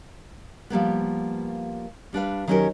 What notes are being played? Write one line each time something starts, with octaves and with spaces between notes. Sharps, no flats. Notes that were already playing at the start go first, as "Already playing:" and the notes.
F3 G3 A#3 B3
G3 D4 B4 F5
D#3 F#3 C#4 F#4 G4 A#4